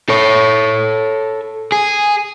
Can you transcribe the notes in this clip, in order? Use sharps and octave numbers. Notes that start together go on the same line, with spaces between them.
A4 C#5
G#4